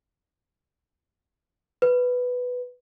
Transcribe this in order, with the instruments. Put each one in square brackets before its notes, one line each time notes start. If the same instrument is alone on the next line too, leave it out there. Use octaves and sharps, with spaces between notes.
[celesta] B4